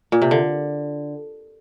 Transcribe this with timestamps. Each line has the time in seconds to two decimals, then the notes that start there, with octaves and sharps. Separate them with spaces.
0.12 A#2
0.22 C3
0.31 D3